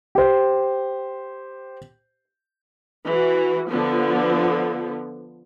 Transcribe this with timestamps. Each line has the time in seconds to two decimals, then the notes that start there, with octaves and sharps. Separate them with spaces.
0.15 G4 C5
3.07 E3 F#4
3.69 D3 F3 B3